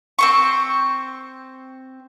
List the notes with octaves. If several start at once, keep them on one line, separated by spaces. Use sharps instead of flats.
C4 C5 C#6